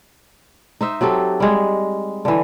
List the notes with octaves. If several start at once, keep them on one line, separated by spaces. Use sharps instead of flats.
D#4 C5 E5
F#3 C4 G4 A4
G3 G#3
D3 E3